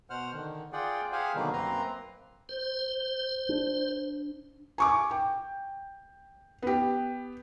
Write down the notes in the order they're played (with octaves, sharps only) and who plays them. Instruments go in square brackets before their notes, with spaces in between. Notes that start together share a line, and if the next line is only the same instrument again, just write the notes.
[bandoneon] B2 C5 F#5 F6
D3 D#3
F4 G#4 D5 F#5 G5
G4 G#4 C5 F5 F#5 G#5
B2 D3 D#3 F#3 G3 A#3
F#2 A#3 C4 B4 A#5 C6
[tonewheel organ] C5
[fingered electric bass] D4
[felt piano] G#5 C#6 D6
G5
B3 G4